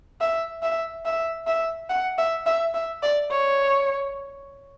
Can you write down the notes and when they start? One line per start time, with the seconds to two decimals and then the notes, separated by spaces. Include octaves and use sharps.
0.21 E5
0.63 E5
1.05 E5
1.47 E5
1.89 F#5
2.18 E5
2.46 E5
2.74 E5
3.03 D5
3.31 C#5